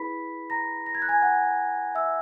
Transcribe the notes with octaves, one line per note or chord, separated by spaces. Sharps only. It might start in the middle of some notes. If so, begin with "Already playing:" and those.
Already playing: E4 G#4 B4 B5 B6
A#5 A#6
A#6
G#6
F#6
G#5 G#6
F#5 F#6
E5 E6